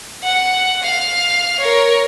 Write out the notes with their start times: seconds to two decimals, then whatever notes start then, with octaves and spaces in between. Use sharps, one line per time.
0.23 F#5
0.83 F5 F6
1.59 A#4 C#5